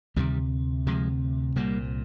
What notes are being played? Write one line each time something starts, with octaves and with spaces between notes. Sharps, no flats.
D2 C3 D#3 G3
D2 C3 F3 G#3
C2 A#2 G3 A#3